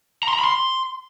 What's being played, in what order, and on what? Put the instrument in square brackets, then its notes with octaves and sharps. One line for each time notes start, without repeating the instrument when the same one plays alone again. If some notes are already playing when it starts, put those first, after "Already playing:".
[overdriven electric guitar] A#5
C6
A#5
B5
C6